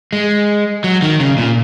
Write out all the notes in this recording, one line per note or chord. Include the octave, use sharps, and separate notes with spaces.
G#3
F#3
D#3
C#3
A#2